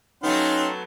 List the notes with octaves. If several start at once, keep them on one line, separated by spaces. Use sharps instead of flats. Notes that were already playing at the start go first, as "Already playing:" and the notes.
F#3 A3 B3 C#4 D#4 F5 G5 C6